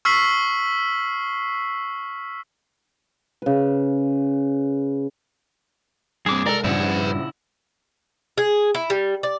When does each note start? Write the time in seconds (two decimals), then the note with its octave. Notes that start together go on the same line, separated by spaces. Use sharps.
0.05 C#6 E6 F6 B6 C7 F#7
3.42 C#3 B4
6.26 G2 C3 G#4 D6
6.46 C2 G#3 A4 A#4 D5
6.64 A#1 G2 C#3 F3 E4 B4 D5 F#5
8.38 G#4
8.75 E4
8.90 G3
9.23 D5